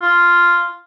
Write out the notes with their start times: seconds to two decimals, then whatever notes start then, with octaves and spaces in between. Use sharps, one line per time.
0.02 F4